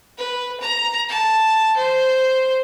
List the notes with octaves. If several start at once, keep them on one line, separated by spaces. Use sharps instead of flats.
B4
A#5
A5
C5